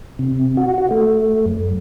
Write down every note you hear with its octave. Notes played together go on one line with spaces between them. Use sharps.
C3
F#4
F#4
A3
F#2